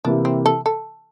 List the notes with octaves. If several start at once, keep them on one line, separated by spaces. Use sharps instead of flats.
C3 E3 A#3 D4 E4 G4
C4
A4
A4